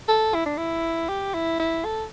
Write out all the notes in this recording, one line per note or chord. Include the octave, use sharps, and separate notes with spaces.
A4
E4
D4
E4
G4
E4
E4
A4